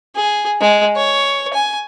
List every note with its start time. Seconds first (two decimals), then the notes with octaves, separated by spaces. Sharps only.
0.16 G#4
0.61 G#3
0.96 C#5
1.53 G#5